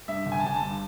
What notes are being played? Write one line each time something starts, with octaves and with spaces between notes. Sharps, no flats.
G2 E5
G1
G#5
A5
G1 G#5
A5
G2